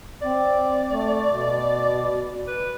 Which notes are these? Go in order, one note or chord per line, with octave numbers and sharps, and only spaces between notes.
C4 D5
A3
B2
B4